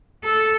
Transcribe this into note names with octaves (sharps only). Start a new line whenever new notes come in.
A4